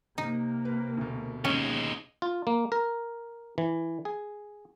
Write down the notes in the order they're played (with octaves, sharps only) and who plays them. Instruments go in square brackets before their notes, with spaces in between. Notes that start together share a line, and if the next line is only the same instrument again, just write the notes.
[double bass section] C3 A#3 [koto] D#4
[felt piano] B4
D2 B2
[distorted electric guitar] D#2 G#3 [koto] C#4
[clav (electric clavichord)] F4
A#3
A#4
E3
G#4